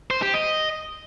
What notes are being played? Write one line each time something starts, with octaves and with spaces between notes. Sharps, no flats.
C5
G4
D#5